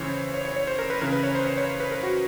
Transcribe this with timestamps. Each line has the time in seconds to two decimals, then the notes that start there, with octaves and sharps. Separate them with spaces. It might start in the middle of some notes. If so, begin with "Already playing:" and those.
Already playing: C#3 E3 C5 C#5
0.34 C#5
0.45 C#5
0.56 C#5
0.67 C5
0.79 A#4
0.90 B4
1.01 C#3 E3 A#4
1.12 B4
1.23 C#5
1.35 C5
1.47 C#5
1.58 C#5
1.80 B4
1.91 A#4
2.03 F#4